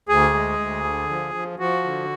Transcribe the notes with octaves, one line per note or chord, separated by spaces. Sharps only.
D2 G#4
G#3
D2
D3
F3
F3
F3 F#4
D3